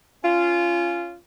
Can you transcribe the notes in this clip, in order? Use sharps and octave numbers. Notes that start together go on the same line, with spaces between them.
C#4 F4